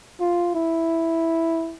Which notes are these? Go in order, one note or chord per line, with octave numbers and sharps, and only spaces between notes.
F4
E4